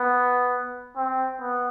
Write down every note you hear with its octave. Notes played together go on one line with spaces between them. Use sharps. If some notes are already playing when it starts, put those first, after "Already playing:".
Already playing: B3
C4
B3